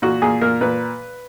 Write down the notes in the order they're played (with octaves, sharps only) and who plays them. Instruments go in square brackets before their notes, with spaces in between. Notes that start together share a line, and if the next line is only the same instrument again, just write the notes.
[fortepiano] A#2 F#4
A#2 G#4
A#2 A#4
A#2 B4